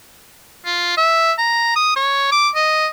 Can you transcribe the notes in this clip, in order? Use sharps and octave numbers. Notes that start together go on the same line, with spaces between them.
F4
E5
A#5
D#6
C#5
D6
D#5